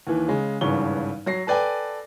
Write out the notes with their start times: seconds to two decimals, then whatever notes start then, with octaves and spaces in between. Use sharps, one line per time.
0.07 D#2 E3
0.28 C#3 G#3
0.61 G#1 G2 C#3 E3 C#6 G7
1.26 F#3 A#6 C7
1.47 A4 B4 D5 G5 G#5